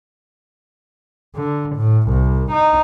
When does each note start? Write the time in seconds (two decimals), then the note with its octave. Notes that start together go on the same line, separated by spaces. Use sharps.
1.36 D3
1.76 A2
2.10 C2
2.52 D#4